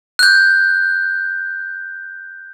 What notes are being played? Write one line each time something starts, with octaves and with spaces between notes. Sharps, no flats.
F#6 G6